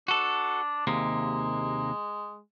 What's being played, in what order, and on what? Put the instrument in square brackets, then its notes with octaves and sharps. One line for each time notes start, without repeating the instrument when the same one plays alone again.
[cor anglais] D4 [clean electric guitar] F#4 A4
[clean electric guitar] D#2 C3 A#3 [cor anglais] G#3